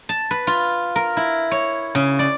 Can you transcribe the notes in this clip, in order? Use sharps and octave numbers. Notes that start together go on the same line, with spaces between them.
A5
B4
F4
A#4
E4
C#5
C#3
D5